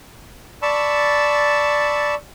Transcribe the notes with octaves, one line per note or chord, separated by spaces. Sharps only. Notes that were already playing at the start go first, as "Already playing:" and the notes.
D5 A5 B5 C#6 E6